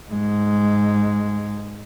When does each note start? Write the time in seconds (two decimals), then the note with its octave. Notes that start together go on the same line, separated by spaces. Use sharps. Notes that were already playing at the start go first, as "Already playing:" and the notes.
0.11 G#2 G#3